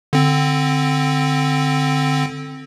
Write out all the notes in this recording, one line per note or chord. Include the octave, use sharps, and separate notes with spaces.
D3 C4